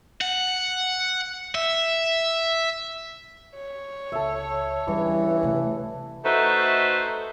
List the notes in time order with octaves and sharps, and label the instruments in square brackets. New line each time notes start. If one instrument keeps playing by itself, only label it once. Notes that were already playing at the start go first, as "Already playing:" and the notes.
[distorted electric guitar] F#5
E5
[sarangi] C#5
[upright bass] C#2 [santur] A4 E5
[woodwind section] G2 C#3 E3 [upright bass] G3
[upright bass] C3 A3
[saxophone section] A3 D#4 F#4 B4 C5 E5